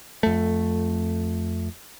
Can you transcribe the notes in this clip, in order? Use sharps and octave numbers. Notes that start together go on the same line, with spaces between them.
F2 A3